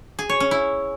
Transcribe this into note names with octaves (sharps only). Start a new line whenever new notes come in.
G#4
C#5
C#4
E4